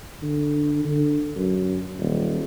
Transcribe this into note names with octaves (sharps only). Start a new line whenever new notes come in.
D3
D3
F#2
D#1